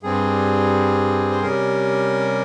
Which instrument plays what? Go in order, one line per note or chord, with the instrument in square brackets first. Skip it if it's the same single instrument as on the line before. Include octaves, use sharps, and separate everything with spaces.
[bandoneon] G2 G3 C4 G#4
C5
C3 G3 C#4 A#4